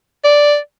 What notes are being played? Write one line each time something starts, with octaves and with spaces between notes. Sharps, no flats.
D5